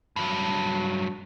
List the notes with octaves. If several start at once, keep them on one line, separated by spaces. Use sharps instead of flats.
G2 F#3